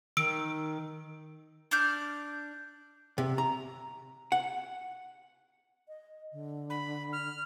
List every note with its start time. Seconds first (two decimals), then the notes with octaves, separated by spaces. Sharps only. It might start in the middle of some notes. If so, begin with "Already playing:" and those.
0.17 D#3 E6 D7
1.71 D4 D6 F6 G6
3.18 C3
3.38 A#5
4.32 F#5
5.88 D#5
6.32 D3
6.70 B5
7.12 F6